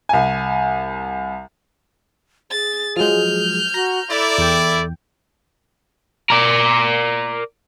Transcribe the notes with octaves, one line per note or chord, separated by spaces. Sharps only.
C2 G#5
G#4 A6
F3 F#3 G#3 F6 G6
F#4 A#5
E4 A4 D5
E2 G5
A#4 D5